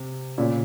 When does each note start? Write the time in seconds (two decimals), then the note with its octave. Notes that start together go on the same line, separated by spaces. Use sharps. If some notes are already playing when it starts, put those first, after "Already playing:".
Already playing: C3
0.38 A#2 C#3